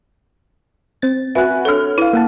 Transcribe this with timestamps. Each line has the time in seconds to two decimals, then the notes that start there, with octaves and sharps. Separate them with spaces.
1.02 C4 A6
1.35 F#4 B4 E5 G#5 F#6
1.65 D4 A4 C#5 F6
1.98 E4 B4 F5
2.13 A#3 F#5 A5